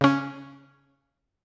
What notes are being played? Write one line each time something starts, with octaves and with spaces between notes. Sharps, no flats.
C#3 C#4